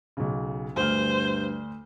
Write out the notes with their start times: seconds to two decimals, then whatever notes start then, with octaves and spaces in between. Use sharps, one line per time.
0.17 B1 C#3
0.77 D2 G2 C5 F6